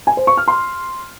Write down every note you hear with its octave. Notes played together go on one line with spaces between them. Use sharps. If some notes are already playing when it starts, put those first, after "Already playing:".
G#5
C5
C#6
F6
C6